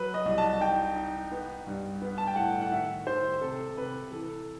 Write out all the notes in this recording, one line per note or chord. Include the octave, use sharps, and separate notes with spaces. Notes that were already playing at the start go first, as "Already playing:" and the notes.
Already playing: F#3 B4
D#5
C2
A5
D#4 G5
D#4
B3
G2
B3
A5
G5
A2 F#5
F#5
D#3 E5
D#3 C5
C3 A4
C3 B4
E3 A4